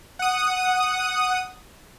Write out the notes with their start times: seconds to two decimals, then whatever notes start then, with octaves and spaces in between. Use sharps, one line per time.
0.19 F#5 D#6